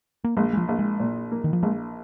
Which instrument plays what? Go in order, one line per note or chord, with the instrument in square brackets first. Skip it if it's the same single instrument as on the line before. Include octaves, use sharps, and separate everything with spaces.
[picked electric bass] A#3
[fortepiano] A#1 [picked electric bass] G#3
[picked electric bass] G#3
F3
[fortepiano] A#1
[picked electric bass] G#3
[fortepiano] A#2
A#3
[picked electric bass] D#3
F3
[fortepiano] A#1 [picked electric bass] G#3